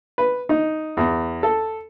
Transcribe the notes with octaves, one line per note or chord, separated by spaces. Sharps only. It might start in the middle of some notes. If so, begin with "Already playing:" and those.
B4
D#4
E2
A4